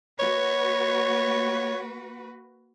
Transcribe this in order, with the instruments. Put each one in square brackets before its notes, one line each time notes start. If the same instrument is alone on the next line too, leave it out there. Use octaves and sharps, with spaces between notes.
[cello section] A#3 F#4 B4 [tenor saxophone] C#5